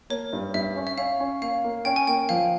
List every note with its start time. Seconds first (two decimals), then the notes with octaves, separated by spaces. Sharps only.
0.10 A#3 C#5
0.33 G2
0.54 G2 E5
0.76 C#4
0.87 E5
0.98 C#4 F5
1.20 C#4
1.42 A#3 F5
1.64 A#3
1.85 C#4 G5
1.96 G#5
2.07 A#3 G5
2.29 F3 F5